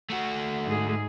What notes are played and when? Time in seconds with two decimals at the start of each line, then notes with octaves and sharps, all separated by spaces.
0.10 A3 F#4
0.66 G#2 G#4